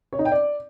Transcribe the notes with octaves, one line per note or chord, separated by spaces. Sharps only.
C#5
D#4
G5
D5